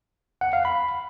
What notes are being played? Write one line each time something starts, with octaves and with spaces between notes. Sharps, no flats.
F#5
F5
B5